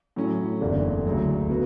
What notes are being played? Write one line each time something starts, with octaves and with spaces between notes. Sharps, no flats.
A2 F#3 C#4
F#1 E2 D3 A3
D2 C#3 F#3 A3
B3 F#4